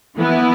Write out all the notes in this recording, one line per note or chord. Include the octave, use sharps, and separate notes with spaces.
E3 B3 E4